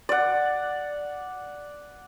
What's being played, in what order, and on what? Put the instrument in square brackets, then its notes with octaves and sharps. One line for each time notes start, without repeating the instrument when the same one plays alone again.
[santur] D5 F#5